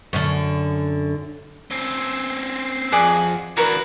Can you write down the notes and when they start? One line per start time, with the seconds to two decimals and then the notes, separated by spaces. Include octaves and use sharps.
0.13 F#2 D3
1.71 C4 C#4
2.92 F2 G#4 D5 F#5
3.57 E3 D4 F#4 A#4 B4